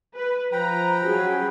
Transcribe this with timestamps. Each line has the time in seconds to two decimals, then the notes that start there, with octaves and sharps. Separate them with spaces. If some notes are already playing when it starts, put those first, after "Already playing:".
0.15 B4
0.52 F3 B4 G5 A#5 B5
1.05 F#3 C#4 F#4 G#4